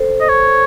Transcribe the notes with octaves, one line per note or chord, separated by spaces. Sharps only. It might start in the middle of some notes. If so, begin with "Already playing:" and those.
Already playing: A4 C5
D#5
C#5